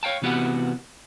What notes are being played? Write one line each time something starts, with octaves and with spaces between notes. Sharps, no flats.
C#5 F5 G5 A5
C3 E3 B3 F#4 G4 F#5